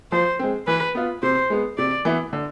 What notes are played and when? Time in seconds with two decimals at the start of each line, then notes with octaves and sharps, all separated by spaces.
0.12 F3 C5
0.39 G#3 C4
0.67 E3 B4
0.95 B3 F4
1.22 C3 C5
1.50 G#3 B3
1.78 C3 D5
2.05 E3 B3 E4
2.33 D3